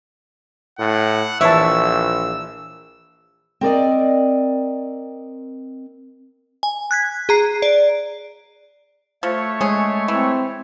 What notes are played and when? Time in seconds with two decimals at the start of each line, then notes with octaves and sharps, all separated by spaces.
0.79 A2 F#5
1.41 A#1 E3 C#5 E5 A5 E6
3.61 C4 A#4 D5 D#5
6.63 G#5
6.91 F#6 G#6 B6
7.29 G#4 A#5 C7
7.62 D5
9.23 F3 A3 C#5
9.61 G#3 C#4 G#4
10.08 E3 C4